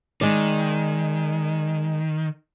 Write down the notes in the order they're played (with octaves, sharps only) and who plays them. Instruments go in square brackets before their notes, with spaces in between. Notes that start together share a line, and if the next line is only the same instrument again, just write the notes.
[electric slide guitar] D#3 [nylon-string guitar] G#3 D5